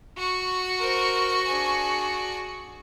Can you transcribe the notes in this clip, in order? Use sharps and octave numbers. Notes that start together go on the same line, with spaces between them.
F#4 C#6
A#4 C5
D4 G#4